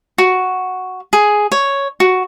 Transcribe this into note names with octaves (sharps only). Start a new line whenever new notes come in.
F#4
G#4
C#5
F#4